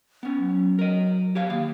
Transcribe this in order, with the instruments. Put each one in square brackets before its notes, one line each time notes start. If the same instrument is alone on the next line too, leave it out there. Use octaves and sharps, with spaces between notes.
[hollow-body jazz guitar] B3 C#4
[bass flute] F#3
[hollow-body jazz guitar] A#4 D#5
G4 C#5 F5
[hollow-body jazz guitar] D#3 F5 [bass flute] A#3